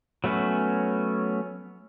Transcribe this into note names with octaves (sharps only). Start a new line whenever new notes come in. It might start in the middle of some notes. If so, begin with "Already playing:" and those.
F#3 A3 B3 C#4